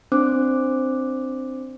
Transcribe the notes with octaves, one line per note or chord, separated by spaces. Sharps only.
C4 D4 C5 D6 F#6